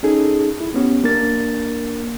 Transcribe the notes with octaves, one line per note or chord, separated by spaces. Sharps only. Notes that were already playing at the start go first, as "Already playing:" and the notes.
C#4 D#4 G#4 A4
E4
B3 C#4 G4
A#3 D4 A#4 A6